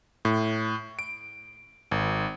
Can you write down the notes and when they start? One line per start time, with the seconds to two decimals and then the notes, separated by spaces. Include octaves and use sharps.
0.25 A2
0.99 D7
1.91 G#1